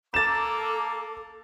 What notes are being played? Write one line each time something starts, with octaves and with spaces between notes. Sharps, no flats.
A#3 A4 D6 A6 E7